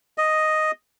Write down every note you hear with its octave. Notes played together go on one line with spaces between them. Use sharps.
D#5